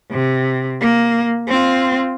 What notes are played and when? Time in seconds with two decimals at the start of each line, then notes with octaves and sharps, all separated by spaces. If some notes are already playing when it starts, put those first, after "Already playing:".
0.11 C3
0.81 A#3
1.48 C4 F4